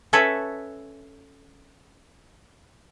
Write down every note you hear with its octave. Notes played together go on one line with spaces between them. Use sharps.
C#4 A4 B4 C#5 E5